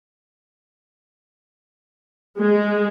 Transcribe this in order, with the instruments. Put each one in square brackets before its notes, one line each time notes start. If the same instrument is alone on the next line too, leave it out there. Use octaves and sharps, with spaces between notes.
[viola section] G#3